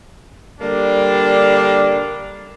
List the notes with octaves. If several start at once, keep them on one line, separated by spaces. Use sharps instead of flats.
D3 G3 A#3 D4